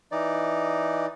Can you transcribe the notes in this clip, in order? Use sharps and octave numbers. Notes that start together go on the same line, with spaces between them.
E3 D#4 D5